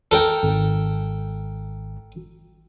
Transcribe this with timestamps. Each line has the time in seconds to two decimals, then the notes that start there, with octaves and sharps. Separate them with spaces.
0.11 A4 A#4 G5
0.43 G#1